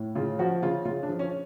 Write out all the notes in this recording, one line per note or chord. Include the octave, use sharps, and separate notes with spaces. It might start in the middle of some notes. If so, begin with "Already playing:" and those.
Already playing: A2
C#3 F4
F3 F#4
C#3 F4
C#3 F4
D4
F3
C#4